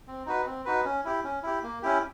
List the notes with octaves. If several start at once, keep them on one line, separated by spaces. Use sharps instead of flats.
C4
D#4 F#4 B4
C4
D#4 F#4 B4
C#4
E4 G4
C#4
E4 G4
A#3
C#4 E4 G4